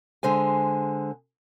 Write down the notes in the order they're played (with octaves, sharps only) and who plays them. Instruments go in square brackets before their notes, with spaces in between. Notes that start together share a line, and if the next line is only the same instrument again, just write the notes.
[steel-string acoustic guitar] D3 G#3 C5 G#5